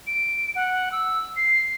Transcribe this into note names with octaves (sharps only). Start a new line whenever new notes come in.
D7
F#5
E6
C7